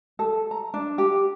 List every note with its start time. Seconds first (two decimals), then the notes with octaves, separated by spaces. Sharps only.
0.19 A4
0.51 A#5
0.74 D4
0.98 G4